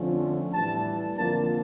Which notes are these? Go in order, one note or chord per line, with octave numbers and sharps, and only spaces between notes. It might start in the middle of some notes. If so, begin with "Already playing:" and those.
Already playing: F2 D3 F3 A3 C#4
A2 E3 G3 A5
F2 D3 F3 A#3 D4 A5